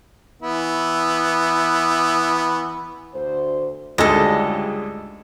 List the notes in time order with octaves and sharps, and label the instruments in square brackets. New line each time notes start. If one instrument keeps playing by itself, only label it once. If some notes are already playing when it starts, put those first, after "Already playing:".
[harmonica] E3 B3 E4
[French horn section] D2 C5
[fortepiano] D2 G#2 G#3 [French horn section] C#3 G3 F4 [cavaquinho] A4 D#5